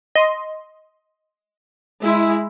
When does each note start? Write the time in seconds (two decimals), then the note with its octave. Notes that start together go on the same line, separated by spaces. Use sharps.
0.15 D#5 C6
2.03 G#3 E4